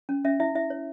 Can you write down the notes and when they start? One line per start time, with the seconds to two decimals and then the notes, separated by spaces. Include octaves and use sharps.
0.09 C#4
0.25 C#4 E5
0.40 E4 E5
0.55 E4 E5
0.70 C#5